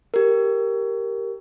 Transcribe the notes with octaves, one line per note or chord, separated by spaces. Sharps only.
G4 A#4